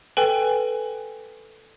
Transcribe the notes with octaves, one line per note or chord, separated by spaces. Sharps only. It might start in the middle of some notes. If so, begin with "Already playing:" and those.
A4 B4 G5 G#5